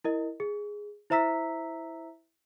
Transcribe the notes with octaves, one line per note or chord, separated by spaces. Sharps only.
E4 A#4 D#5
G#4
E4 C5 E5 A#5 E6 B6